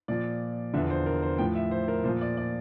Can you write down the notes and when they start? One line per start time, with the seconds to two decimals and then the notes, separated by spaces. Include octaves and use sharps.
0.08 A#2 F3 D5
0.74 E2 D3 F3 E5
0.90 C5
1.06 A#4
1.22 C5
1.38 A2 F3 G5
1.55 E5
1.71 C5
1.88 A#4
2.04 A#2 C5
2.09 F3
2.21 D5
2.37 D5